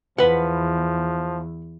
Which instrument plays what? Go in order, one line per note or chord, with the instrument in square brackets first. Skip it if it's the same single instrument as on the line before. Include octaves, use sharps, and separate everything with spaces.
[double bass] E2 [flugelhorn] F3 [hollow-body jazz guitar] B4 F#5